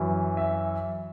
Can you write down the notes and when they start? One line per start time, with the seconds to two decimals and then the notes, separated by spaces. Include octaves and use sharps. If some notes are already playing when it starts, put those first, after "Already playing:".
Already playing: F#2 E3
0.37 E5